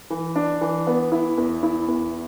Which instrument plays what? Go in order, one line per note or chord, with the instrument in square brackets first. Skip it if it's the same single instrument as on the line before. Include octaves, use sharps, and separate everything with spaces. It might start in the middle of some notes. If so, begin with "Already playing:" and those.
[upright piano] E3
D4
E3
B3
E4
E2
E4
E2